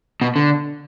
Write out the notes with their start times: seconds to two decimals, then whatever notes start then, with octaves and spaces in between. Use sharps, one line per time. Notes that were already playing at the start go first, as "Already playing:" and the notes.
0.21 B2
0.36 D3